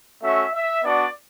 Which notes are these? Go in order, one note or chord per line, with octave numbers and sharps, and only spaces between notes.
A3 C#4 F#4 E5
E5
B3 D4 F#4 D5